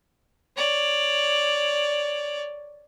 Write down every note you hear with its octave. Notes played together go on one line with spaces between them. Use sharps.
C#5 D5